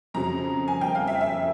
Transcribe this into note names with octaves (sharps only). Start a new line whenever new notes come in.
F2 C#3 F#3 A#5
G#5
G5
F5
E5
E5